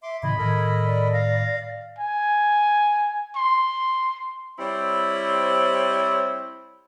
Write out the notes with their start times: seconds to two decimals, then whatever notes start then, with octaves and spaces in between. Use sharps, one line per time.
0.03 E5 C6 D6
0.23 A2 C#3 E3 D#5 B5 G#6
0.38 A2 D#3 A4 A#4 D#5
0.85 D5
1.13 F5 A#6
1.98 G#5
3.36 C6
4.59 G3 C4 E4 C5 C#5